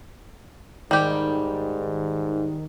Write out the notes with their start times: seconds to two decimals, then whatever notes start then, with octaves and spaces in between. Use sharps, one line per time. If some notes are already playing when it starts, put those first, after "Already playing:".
0.91 G#2 D#3 G3 G4